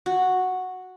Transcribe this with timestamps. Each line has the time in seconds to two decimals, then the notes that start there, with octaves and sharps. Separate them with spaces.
0.06 F#4